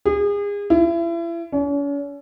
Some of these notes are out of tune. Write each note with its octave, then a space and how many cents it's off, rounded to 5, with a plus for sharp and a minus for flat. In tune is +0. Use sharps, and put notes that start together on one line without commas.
G#4 -35
E4 +35
C#4 +40